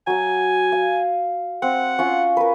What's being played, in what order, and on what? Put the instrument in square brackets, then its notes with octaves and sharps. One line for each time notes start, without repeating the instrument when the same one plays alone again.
[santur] F#3 F#5 [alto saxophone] G#5
[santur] F5
[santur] C4 [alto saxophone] F#5
[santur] C#4 F4 C6
A#4 B4